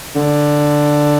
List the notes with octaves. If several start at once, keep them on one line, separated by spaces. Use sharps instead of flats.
D3